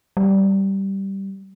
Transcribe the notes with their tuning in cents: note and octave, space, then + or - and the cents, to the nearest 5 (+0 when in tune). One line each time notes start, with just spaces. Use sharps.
G3 -10